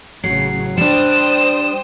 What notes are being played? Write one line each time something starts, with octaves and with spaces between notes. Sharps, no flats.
A1 C#3 F#3 C7
G3 D4 C5 G5 D#6 E7